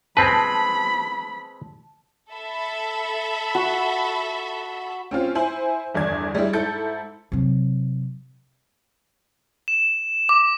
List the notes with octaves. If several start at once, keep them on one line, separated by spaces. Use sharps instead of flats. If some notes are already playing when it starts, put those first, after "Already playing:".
G#3 C4 B4 A5 B5 A#6
A4 E5 B5
F#4
C4 C#4 F4
E4 C5 G#5 F#7
G1 E2 D5 G#6
G3 G#3 E4
G#2 E4 A4 G6 A6 C#7
C3 F#3
E7
D6